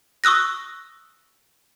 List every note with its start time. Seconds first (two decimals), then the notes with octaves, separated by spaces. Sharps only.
0.24 C#6 D#6 E6 F#6 A#6